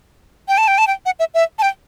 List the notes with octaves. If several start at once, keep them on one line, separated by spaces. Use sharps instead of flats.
G5
A5
G5
A5
G5
F#5
E5
E5
A5
G5